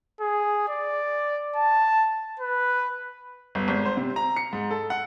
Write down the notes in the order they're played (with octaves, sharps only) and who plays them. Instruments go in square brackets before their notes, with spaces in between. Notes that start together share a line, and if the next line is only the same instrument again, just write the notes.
[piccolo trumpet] G#4
D5
A5
B4
[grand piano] G1
G#1
C5
C3
A#5
C#7
G#2
A4
F#5